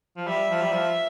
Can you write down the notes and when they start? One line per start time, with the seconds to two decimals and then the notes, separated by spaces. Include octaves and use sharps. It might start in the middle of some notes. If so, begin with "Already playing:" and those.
0.17 F3
0.27 G3 E5
0.50 F3
0.62 G3
0.72 F3